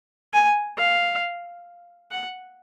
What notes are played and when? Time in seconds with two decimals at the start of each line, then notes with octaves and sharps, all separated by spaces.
0.33 G#5
0.78 F5
2.11 F#5